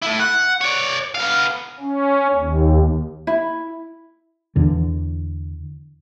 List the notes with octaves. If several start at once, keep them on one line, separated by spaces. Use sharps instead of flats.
A3 E4
F#5
C#5 D5
B3 F5
C#4
D#2
E4
E2 D3